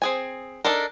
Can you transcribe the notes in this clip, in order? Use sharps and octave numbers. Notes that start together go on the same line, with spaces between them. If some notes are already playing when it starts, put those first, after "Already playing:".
C4 G#4 G#5
D4 D#4 A4 A#4